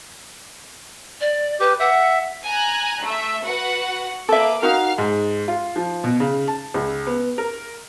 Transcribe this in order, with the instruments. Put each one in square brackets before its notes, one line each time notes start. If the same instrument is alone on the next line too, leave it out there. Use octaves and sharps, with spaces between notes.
[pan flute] D5
[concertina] G4 [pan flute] B4
[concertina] E5 [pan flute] F#5
[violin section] G#5 A#5 F#6
A3 E5
F#4 B4 F#5
[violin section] A#3 B4 D6 [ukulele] A4 E5
[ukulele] D#4 F#4 A#4 [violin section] F5 F6
[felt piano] G#2
F4
F3
B2
C#3
A5
C#2
B3
A#4